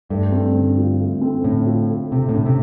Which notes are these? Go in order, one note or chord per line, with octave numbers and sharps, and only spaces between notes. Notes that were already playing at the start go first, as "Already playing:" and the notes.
G2 A3
C4
D3
F4
A3
C4
A2 D3
F4
A3
C3 C4
A2 D3
C3